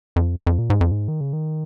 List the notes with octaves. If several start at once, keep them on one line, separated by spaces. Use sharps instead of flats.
F2
F2
A#2
G#2
F2
G#2
D#3
C#3
D#3